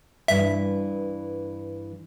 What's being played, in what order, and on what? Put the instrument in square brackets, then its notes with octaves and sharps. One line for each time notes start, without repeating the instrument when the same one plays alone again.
[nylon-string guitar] G2 E3 [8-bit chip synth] E5